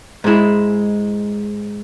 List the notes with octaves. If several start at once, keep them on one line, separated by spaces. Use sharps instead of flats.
G#2 G#3 E4